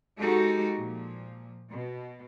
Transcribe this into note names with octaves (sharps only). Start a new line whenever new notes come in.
G#3 D#4 F#4 G4 A4
A#2 F3
B2